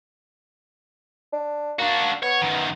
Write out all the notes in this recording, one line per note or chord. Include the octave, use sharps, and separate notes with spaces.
D4
A#3 D4 F#4
B3 C#5
F#2 D#3